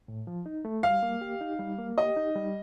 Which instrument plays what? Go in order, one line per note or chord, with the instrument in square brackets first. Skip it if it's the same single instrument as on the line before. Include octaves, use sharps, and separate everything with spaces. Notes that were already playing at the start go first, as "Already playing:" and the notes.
[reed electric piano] A2
F3
D#4
A3
[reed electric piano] G3 [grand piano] F5
[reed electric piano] A#3
G4
D#4
G3
A#3
[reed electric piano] G4 [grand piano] D#5
[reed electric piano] D#4
G3